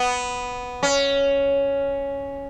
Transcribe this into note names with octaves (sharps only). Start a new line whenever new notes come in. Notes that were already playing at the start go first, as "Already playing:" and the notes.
Already playing: B3
C#4